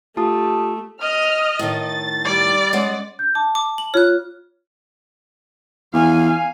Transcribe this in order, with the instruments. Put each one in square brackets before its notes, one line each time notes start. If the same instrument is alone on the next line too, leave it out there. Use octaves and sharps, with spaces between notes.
[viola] A3 [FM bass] F4 [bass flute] G4 [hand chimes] A5 D#6
[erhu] D#5 [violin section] F6
[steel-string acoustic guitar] A2 D#3 [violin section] A6
[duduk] G3 [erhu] D5
[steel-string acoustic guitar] G#3 C#4 F#5
[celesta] G6
[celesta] A5 [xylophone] D6
[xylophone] D6
F#7
[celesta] F4 F6 [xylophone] C#5 F#6
[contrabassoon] E2 [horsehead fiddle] F5 G#5